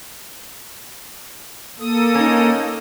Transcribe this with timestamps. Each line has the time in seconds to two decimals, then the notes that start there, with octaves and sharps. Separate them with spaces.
1.80 A#3 A4 D#6
2.15 C#4 D#4